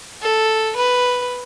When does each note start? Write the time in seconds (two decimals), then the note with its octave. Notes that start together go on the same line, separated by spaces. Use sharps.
0.23 A4
0.77 B4